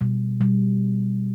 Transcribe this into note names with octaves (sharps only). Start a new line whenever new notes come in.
B2 G3
B2 G3